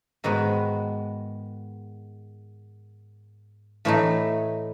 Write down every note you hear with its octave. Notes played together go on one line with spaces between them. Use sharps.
G#2 D#3 G#3 B3 F#4
A2 E3 A3 D#4